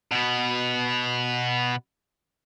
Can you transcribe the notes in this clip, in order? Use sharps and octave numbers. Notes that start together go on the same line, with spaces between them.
B2 B3